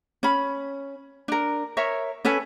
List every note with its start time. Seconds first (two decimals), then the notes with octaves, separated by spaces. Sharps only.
0.23 C#4 B5
1.28 D4 A#4
1.77 A#4 C#5 E5
2.25 C#4 A4 B4 G#5